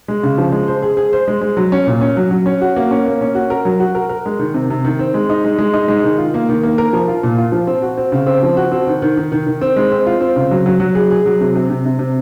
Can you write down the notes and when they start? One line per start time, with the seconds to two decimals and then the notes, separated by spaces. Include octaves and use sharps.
0.08 G#3
0.23 C#3
0.38 F3
0.52 G#3
0.68 C5
0.82 G#4
0.97 G#4
1.13 C5
1.28 G#3
1.41 G#3
1.57 F#3
1.72 C#4
1.87 A#2
2.01 C#4
2.17 F#3
2.31 F#3
2.46 C#4
2.61 F#4
2.76 A#3
2.91 C#4
3.06 A#3
3.21 C#4
3.35 F#4
3.50 A#4
3.65 F#3
3.80 F#4
3.95 A#4
4.09 A#4
4.26 G#3
4.39 D#3
4.54 C3
4.70 C3
4.85 D#3
4.99 C4
5.14 G#3
5.30 D#4
5.44 G#3
5.59 G#3
5.73 D#4
5.88 G#3
6.04 D#3
6.18 F4
6.34 A#3
6.49 D#3
6.63 A#3
6.78 A#4
6.93 F3
7.08 F4
7.23 A#2
7.38 F4
7.52 F3
7.67 C4
7.82 F#4
7.97 C4
8.12 C#3
8.27 C4
8.43 F3
8.57 F#4
8.72 C4
8.87 D#3
9.02 D#3
9.17 D#3
9.32 D#3
9.46 D#3
9.61 C4
9.76 G#3
9.92 C4
10.07 F4
10.20 C4
10.36 C#3
10.51 F#3
10.66 F#3
10.80 F#3
10.95 G#4
11.11 G#4
11.26 F#3
11.41 C3
11.56 C3
11.70 C3
11.85 C3
11.99 C3